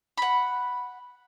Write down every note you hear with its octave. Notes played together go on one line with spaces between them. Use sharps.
F#5 B5